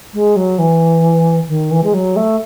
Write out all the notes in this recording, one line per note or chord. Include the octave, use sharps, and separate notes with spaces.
G#3
F#3
E3
D#3
E3
G#3
F#3
A3